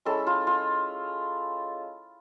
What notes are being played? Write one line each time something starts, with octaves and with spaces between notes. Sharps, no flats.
G#3 C#4 E4 A4
F4
F4